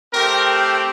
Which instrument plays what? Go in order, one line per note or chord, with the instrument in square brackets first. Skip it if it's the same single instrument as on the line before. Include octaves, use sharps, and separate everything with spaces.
[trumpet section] A3 C4 G4 A#4